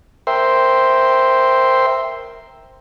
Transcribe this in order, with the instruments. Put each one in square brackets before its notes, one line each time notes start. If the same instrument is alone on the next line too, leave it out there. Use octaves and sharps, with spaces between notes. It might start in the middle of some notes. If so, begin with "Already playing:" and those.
[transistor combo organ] A#4 C5 E5 G5 C6